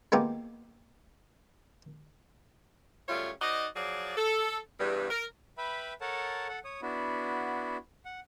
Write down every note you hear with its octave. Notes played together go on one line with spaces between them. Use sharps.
G#3 A#3 B3 F4 G4
F#2 C#3 G3 A3 F4 C#5
D#4 F#4 C5 D5 D#5
F3 F#3 G#4 D5
A4
E2 G2
A#4
B4 E5 G5 B5
A4 A#4 C#5 F#5 A5
A4 F#5
C#5 D#6
B3 D4 E4 F#4
F#5